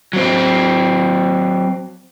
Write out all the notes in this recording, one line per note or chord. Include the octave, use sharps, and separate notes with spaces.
F#3 C4